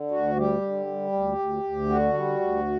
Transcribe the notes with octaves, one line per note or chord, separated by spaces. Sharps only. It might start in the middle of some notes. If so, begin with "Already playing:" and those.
Already playing: D3
D2 F#4
G3 G4
D3
G3
D2
D2
D2
D3 F#4
G3
D2